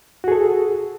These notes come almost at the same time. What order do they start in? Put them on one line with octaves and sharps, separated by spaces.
F#4 G#4 A4